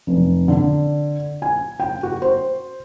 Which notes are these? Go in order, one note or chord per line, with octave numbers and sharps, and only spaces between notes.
F1
D3
G#5
G5
F#4
C5